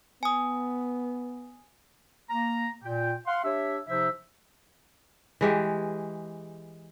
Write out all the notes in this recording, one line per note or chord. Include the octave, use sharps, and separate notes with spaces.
B3 G#5 D#6
A#3 A#5
A#2 G5
F5 F#5 C6
D4 G4 C#5 E5
C3 F3 D#4 C5 E5
E3 G#3 G4